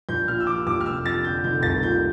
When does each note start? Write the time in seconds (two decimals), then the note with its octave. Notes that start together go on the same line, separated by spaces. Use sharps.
0.09 A#1 G6
0.28 A#2 F6
0.40 E6
0.47 F3 D6
0.66 A#1 D6
0.81 F6
0.86 F1 E6
1.05 F2 A6
1.24 D3 G6
1.44 F1 G6
1.63 C2 A6
1.83 A#2 G6